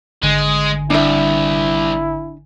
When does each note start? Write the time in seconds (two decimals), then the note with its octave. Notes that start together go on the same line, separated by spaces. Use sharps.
0.23 G#1 D3 G#3 G#5
0.90 C2 D4 E4 E5